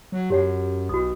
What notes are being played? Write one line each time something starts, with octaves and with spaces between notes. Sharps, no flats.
F#3
F#2 G4 C#5 F#5
B1 F#4 D#6